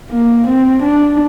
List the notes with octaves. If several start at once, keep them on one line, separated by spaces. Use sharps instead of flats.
A#3
C4
D4